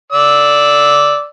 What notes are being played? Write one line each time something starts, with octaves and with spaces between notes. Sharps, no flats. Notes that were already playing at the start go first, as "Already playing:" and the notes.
D5 E6